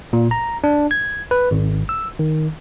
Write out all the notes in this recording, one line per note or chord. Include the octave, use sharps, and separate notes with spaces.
A#2
A#5
D4
G#6
B4
G#1
E6
D#3